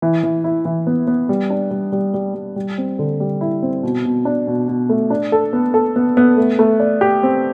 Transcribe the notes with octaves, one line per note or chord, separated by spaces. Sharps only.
E3
E3
E4
E3
B3
B3
G3
D4
G3
G3
G3
G3
G3
C4
D3
G3
E4
C4
B2
B2
D4
B2
B2
A3
D4
A4
B3
A4
B3
B3
A3
A3
D5
G4
C4